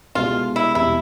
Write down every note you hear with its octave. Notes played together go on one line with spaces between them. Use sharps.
C2 B2 G#3 B3 F4
E4
E1 E2 B2 G3 C4 E4